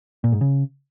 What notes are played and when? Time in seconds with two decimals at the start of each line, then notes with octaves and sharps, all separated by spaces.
0.24 A#2
0.32 G#2
0.41 C#3